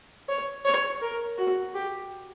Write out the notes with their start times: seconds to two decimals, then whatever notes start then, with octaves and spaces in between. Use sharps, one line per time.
0.29 C#5
0.65 C#5
1.02 A#4
1.38 F#4
1.75 G4